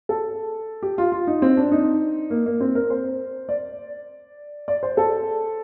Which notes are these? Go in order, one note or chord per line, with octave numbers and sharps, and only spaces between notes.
A4
G4
F4
F4
D#4
C4
D4
D#4
A#3
A#3
C4
A#4
C5
D5
D5
C5
A4